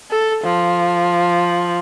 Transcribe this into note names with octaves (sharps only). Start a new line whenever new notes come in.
A4
F3